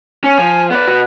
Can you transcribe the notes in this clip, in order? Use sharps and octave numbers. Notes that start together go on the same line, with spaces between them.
C#4 G#5
F3
B3 B4 D5
B2 F#4